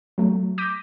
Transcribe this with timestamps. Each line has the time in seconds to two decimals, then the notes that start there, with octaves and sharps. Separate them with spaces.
0.18 F#3 A3
0.58 D6 G6 A#6 B6 D#7